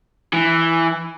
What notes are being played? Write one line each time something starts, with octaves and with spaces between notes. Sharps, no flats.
E3